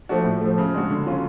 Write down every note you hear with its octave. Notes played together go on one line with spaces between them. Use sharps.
F3 A3 D4 F#4
A2
F3 A3
C#3
G#3 D4 F#4
D3
F#3 C#4 F4